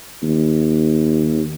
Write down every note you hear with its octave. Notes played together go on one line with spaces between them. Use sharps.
D#2